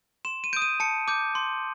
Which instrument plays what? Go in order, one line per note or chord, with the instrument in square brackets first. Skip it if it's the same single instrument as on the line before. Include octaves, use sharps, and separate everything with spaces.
[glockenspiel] C6 E7
D#7
G6 D7
D#6
D#7
A5 C#7
D6 G6
C6